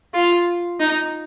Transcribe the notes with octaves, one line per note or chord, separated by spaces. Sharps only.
F4
D#4